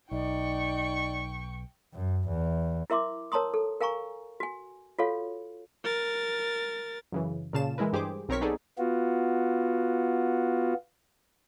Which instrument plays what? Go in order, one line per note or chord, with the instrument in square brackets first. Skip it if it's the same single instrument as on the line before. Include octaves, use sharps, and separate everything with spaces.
[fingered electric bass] B1 [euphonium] D#4 [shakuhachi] D5 [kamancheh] G5 C#6
[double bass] F#2
E2
[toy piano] E4 A#4 E5 C6 D6
A#4 C#5 A5 A#5 C6 D#6
A4
A#4 F5 G#5 A#5 C#6
F#4 G#5
F4 F#4 A4 C#5 F5
[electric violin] A#4 A6
[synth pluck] F#2 C#3 E3
A#2 C#3 F5 A5 E7
E3 G#3 E4 A#4 B4
G2 G4 G#4 C5 D6
B1 C4 A#4 C#5 C#6 B6
B3 D#4 G#4 A4 D5
[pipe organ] B3 F4 F#4